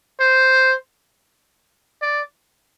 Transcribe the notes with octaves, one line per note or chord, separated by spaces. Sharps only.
C5
D5